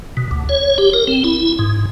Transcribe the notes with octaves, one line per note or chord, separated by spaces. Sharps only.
B2
D2
C#5
G4
A#4
C4
E4
G#2